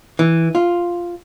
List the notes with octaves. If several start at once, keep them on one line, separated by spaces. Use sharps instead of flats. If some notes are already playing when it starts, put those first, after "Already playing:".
E3
F4